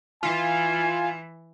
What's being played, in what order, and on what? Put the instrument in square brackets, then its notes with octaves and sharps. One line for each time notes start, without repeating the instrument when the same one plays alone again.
[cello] E3 [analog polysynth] F4 [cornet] G#5